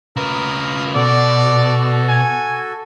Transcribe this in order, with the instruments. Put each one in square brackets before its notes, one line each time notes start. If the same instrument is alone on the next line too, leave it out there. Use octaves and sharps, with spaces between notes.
[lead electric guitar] C#3 B4 [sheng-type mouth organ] A#4 A#5 D#6
[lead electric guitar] B2 [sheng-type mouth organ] F#4 A4 [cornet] D5
[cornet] G#5